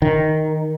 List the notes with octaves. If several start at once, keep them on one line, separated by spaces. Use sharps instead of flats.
D#3